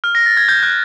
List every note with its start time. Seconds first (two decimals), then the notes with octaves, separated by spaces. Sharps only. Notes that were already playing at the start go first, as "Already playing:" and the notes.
0.04 F6
0.15 A#6
0.26 A6
0.37 G#6
0.48 G6
0.63 F#6